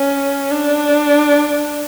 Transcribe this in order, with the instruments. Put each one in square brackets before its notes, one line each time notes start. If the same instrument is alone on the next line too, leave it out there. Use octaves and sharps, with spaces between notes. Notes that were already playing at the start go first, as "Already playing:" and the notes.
Already playing: [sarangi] C#4
D4